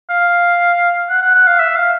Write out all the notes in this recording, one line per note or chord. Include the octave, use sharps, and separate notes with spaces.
F5
F#5
F#5
F#5
F5
E5
F5